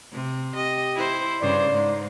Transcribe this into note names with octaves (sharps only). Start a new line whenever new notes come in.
C3
G4 D#5
E4 C5
G2 C#3 C5 D5
G#2